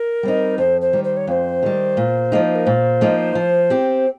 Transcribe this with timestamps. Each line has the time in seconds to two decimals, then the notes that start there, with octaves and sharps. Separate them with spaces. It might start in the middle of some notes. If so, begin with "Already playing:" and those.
Already playing: A#4
0.23 G3 C4 D#4
0.58 F2 C5
0.81 C5
0.93 D#3 G3
1.04 C5
1.17 C#5
1.27 F2 C#5
1.32 C5
1.63 D#3 G3
1.97 A#2
2.32 F3 A#3 D#4
2.56 A#4
2.66 A#2 C5
3.01 F3 A#3 D#4
3.35 F3
3.70 C4 G4